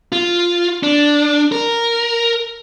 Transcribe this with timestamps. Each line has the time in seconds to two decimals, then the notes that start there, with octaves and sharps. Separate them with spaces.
0.12 F4
0.83 D4
1.52 A#4